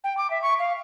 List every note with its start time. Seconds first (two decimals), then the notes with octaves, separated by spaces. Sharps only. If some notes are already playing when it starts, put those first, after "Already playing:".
0.04 G5
0.17 D6
0.30 E5
0.42 C#6
0.59 F5